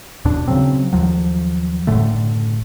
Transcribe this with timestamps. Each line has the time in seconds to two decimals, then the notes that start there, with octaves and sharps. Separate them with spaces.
0.25 D#2 B2 D4
0.48 C#3 F#3 C4
0.93 D#2 F3 F#3
1.87 F#1 A2 D3 A3